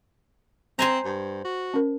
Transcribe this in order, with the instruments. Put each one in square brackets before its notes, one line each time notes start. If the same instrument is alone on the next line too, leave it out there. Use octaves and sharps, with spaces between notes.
[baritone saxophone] C4 [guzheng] C5 G#5 A#5
[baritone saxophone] G2
F#4
[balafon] C#4 A#4